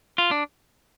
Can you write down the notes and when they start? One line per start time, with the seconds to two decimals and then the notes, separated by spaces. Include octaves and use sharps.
0.18 F4
0.31 D4